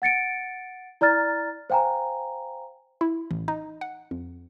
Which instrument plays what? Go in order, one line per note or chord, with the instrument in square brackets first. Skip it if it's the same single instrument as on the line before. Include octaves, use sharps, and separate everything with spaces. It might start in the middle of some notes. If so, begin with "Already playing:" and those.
[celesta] F#5 A6 C#7 D7
E4 D5 A#5 F6 A6
C5 F5 G5 G#5 A#5
[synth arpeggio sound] E4
A1
D#4
F#5
F2